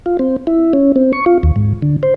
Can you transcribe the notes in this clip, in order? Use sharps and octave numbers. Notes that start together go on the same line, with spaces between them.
F4
C4
E4
C#4
C4
C#6
F4
D#2
G#2
D3
C5